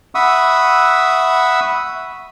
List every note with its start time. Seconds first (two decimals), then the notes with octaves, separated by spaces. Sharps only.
0.15 E5 F#5 B5 C#6 D#6 E6